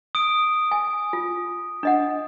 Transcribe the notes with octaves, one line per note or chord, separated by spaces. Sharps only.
D#6 D7
G#5
F4
D4 D#5 F#5